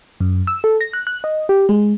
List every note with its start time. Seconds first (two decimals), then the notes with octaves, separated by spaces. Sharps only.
0.20 F#2
0.47 E6
0.64 A4
0.81 A#6
0.93 F#6
1.07 F#6
1.24 D#5
1.49 G4
1.69 G#3